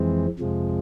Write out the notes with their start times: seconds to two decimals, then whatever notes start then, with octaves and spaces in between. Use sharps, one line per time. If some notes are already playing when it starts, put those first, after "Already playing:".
Already playing: F2 E3 G#3 C4
0.39 F2 C3 F3 G#3